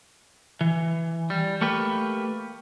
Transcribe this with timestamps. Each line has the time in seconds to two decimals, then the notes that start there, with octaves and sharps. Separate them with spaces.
0.61 E3
1.30 G3
1.61 A3 A#3 G4 B4